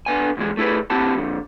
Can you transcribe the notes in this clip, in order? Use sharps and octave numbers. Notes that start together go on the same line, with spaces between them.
D3 B3 G#5
C2 E3 G#3
A3 E4 G#4 B4
C4 E4 F#4 G4 A5
F2 D3